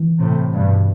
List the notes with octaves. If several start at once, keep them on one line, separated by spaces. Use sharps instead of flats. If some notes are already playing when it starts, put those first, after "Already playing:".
Already playing: E3
A2 C3
G2 B2